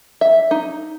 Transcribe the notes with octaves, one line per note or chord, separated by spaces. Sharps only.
E5
D#4